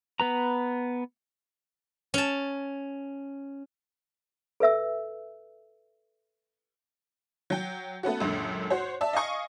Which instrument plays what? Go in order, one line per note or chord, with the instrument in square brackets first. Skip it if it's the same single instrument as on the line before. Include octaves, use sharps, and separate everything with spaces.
[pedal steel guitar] B3 B4 A#5
[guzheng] C#4 A5
[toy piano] A4 B4 E5 E6
[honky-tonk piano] F#3 G5
A3 B3 C#4 F#4
C#2 F#2 A#2 D3
F#4 C5 C#5
D5 E5 A5
D#5 F5 G#5 C#6 D#6